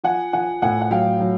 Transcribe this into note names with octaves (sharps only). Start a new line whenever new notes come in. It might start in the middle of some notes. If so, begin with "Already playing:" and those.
F3 F#5 G#5
F3 F#5 G#5
A2 F#5 G#5
F#5
F#3 F5 G5
F#3